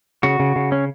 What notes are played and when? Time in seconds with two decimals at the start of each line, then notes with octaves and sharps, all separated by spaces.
0.23 C#3 F#4
0.40 C#3
0.56 C#3
0.72 C#4